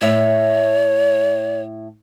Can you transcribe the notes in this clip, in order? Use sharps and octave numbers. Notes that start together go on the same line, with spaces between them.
A2 C#5 E5